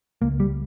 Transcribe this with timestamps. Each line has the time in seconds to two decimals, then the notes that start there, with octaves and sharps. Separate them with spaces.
0.22 C#2 A#3
0.40 G3